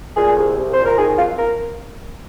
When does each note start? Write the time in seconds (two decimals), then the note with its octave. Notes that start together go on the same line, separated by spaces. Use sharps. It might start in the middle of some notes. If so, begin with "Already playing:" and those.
0.16 A#2 G#4
0.37 C2
0.57 C2
0.74 A#2 C5
0.86 A#4
0.98 D#3 G#4
1.18 F2 F4
1.38 A#4